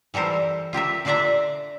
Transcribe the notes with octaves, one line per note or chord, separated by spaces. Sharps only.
E3 G3 A4 A#4 C5
F4 G4 A#4 E5
D3 D4 F4 D5 E5 A#5